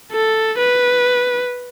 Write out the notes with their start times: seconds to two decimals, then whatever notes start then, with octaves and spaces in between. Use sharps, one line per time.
0.12 A4
0.58 B4